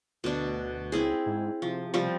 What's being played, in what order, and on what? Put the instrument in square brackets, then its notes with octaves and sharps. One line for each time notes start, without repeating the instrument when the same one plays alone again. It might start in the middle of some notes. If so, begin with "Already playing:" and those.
[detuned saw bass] D2 [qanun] B2 D4
[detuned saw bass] C#2 [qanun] C4 E4 G#4
[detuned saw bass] G#2
[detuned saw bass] C3 [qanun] F3
[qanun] F3 G3 C4